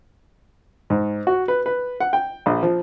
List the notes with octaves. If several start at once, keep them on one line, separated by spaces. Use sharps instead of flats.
G#2
F#4
B4
B4
F#5
G5
A#1
F3